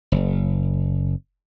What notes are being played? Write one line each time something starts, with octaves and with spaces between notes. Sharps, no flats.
F#1